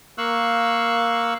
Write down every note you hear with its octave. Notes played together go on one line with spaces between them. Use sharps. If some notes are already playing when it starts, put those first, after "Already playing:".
A#3 F5 C#6 E6 F#6